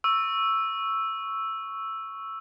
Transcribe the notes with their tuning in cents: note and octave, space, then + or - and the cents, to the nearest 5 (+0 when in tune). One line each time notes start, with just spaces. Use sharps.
C#6 +0 E6 +0